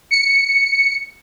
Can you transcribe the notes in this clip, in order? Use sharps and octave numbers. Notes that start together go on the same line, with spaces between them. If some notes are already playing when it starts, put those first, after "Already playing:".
C#7